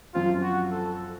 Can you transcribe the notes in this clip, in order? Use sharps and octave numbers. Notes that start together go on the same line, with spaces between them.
F#2 F3 C4 F4
F#4
A4